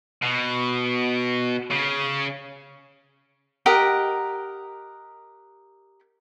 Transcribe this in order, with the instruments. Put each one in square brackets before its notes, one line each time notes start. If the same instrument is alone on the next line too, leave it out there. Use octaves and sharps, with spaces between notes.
[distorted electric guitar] B2
C#3
[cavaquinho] G4 A#4 D#5 F#5